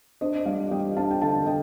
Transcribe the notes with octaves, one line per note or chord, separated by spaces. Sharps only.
D4 C5 D#5
G3 D5 F5
G3 D#5 G5
D4 F5 A5
G5
D3 F5 A5
D3 D#5 G5